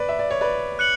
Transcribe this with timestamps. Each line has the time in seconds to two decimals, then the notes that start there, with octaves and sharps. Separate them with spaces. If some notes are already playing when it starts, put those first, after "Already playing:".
Already playing: B4 D5
0.09 E5
0.19 D5
0.31 C#5
0.41 B4 D5
0.79 F#6 C#7 F#7